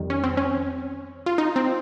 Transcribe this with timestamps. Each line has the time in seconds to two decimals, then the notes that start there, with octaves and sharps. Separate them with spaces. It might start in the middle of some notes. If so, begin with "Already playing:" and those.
Already playing: F2 D#3 G3
0.10 C#4
0.24 C4
0.37 C#4
1.26 F4
1.38 D#4
1.56 C4